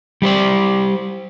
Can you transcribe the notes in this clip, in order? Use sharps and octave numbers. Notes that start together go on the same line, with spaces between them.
G3 G4 C5 D5